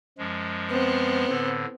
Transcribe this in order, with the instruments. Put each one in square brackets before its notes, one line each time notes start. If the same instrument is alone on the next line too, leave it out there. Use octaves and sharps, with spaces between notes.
[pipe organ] F#2 F3 G#3
[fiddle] B3 C4
[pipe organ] A2 D3